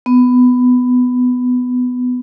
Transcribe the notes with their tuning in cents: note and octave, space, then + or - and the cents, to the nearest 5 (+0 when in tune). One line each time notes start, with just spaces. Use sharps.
B3 +15